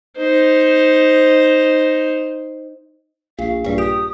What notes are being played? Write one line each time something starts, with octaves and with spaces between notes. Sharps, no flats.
D#4 C5
A#1 F5
A#1 G2
G4 D#6